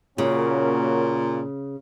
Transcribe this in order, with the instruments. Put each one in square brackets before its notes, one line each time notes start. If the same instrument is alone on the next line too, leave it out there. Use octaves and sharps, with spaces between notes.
[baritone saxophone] A#2 [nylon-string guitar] C#3 [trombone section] A#3 C#4 F#4